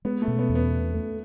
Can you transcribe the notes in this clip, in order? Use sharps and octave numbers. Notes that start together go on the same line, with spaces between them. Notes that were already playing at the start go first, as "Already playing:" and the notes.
G#3 B3
A3
B2
B3
E2
B3
A3
A3